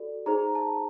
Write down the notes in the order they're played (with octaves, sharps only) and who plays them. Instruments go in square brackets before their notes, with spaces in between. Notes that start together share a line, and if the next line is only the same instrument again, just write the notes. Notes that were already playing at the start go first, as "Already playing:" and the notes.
Already playing: [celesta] F#4 A4 D5
D#4 G#4 C5 A#5
A5